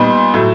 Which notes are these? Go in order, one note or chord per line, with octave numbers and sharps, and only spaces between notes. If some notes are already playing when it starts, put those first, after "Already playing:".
Already playing: A#2 G3 B3 D#4
A2 F#3 A3